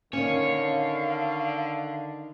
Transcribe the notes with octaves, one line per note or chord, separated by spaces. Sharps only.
D3 D#3 C#4 C#5 F5